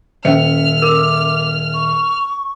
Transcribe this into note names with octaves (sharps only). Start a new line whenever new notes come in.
D#1 C#4 C5 E5 F6 C#7
A#4 D6
C#6